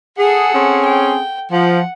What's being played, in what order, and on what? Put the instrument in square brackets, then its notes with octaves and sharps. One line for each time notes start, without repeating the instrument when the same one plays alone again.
[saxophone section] G#4 [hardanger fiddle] A4 F#5
[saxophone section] C4 C#4 G#4
[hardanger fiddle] G5
[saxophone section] F3 [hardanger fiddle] F#5